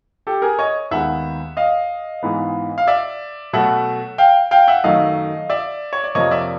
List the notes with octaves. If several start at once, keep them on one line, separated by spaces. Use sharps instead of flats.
G4 A4
G#4 A#4
C#5 D#5
D#2 D#3 G#3 B3 E5 F#5
D#5 F5
G#2 E3 G#3 B3
F5
D5 E5
B2 F#3 A3 E5 F#5
F5 G5
F5 G5
E5 F#5
F#2 D#3 F#3 A3 D#5 F5
D5 E5
C#5
D5
F2 C3 F3 A#3 C#5 D#5
D5 E5